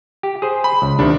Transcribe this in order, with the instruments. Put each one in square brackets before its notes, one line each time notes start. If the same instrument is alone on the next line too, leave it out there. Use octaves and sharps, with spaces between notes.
[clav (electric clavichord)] G4
G#4 C5
[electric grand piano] B5
[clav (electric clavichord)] C#2
[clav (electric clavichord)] D2 C3 D#3 [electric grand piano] D4